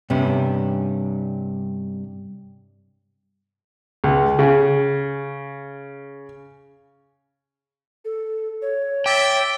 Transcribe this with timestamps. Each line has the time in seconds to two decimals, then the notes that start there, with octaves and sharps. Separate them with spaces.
0.10 G2 C3 G3 B3 C#4
4.04 C#2
4.39 C#3
8.05 A4
8.62 C#5
9.06 E5 G5 D6 A6 G7